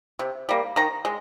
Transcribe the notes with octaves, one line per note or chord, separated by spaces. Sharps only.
C3
G3 A#3
D#3 A#5
G#3